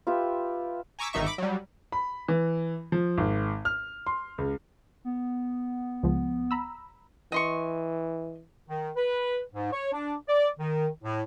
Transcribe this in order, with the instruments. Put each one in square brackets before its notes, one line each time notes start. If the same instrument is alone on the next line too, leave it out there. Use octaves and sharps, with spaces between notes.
[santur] F4 G4 B4 E5
[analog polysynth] G#5 A#5 C#6 D6 E6 B6
G#1 D#3 D#4 E5 C#6
B5 D6
F#3 G3
[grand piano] B5
E3
F3
G#1
F6
C6
C#2
[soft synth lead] B3
[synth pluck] C#2 F3
A#5 B5 E6
[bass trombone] E3 [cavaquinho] D#5 C6 C#6
[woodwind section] D#3
B4
G#2
C#5
D4
D5
D#3
A2